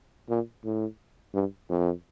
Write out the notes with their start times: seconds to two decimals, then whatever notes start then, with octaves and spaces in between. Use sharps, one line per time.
0.29 A#2
0.65 A2
1.34 G2
1.69 F2